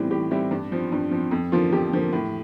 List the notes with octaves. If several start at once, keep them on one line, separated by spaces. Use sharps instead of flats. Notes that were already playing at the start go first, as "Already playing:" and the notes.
Already playing: A2 E3 G3 C4
A2 G4
E3 G3 C4 E4
G2 D4
F3 C4
G2
F3 C4
F2
D3 F3 A#3 F4
F2 G4
D3 F3 A#3
A2